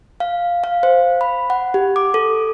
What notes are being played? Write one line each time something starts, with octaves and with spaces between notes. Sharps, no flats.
F5
F5
C5
B5
F#5
G4
D6
A4